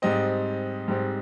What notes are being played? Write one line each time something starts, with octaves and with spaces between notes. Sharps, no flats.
G#2 G3 C4 D#5
G#2 G3 C4